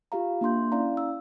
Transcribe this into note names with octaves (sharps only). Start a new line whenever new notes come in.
F4 G4 F5 A#5
A#3 D4 C6 G6
C#4 E4 D5 F5 A#5
E6